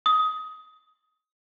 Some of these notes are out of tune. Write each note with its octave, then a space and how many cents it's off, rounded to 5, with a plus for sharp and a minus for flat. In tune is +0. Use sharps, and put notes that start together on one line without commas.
D#6 +20